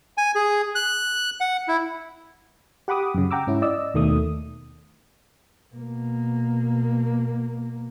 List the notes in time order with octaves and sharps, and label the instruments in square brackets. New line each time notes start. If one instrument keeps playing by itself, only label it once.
[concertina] G#5
G#4
F#6
F#5
E4
[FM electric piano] G4 F#5 B5 D6 D#6
F#2 C#3
F#5 G5 A#5 D6 E6
G#2 C#4 E4
D5 D#5 E6
D#2 B2 D#3 A3 D#6
[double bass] B2 A#3